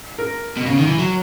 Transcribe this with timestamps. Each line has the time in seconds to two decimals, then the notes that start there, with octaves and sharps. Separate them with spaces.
0.18 A#4
0.57 B2
0.66 C#3
0.77 D#3
0.87 E3
0.99 F#3